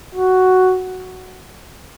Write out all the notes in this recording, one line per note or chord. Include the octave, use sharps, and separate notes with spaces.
F#4